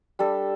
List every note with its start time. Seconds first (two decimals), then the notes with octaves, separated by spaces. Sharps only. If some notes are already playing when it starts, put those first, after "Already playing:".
0.19 G3 D4 A4